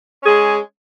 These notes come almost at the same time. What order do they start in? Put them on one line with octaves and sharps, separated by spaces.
C#4 G#4 G#3